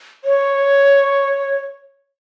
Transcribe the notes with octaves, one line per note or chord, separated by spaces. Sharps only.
C#5